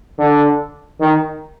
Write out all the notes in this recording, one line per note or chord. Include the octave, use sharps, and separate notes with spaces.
D3
D#3